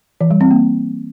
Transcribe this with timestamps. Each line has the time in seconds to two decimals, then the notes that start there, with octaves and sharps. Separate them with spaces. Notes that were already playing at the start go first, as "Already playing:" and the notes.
0.21 E3
0.31 G3
0.41 C4
0.51 A#3